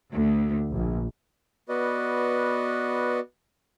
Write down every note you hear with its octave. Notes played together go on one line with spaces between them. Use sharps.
D2
A#1
B3 F#4 B4 D5 D#5